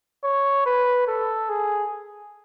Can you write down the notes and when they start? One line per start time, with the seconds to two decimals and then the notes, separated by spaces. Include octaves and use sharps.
0.24 C#5
0.66 B4
1.07 A4
1.49 G#4